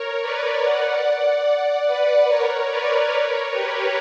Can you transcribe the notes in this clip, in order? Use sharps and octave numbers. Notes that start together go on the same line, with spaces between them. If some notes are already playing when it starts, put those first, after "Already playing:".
Already playing: A#4 C#5
B4 D5
D5 F#5
D5 F#5
B4 D5
A#4 C#5
B4 D5
A#4 C#5
G4 B4